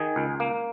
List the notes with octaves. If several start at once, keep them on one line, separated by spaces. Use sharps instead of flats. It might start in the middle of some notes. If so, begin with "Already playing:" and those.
Already playing: D#3 G#4
C#2
A#3